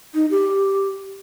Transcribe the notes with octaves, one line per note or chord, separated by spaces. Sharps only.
D#4
G4